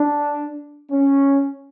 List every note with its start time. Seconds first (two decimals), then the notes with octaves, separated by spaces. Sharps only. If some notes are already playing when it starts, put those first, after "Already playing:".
Already playing: D4
0.91 C#4